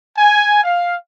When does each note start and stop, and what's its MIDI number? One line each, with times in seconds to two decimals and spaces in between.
0.17 0.60 80
0.64 0.95 77